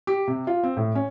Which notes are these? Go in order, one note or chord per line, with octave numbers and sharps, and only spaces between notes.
G4
C3
F4
C4
A2
C#4